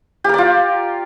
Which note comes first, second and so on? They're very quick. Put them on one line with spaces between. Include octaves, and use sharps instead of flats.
G4 A#4 D5 F4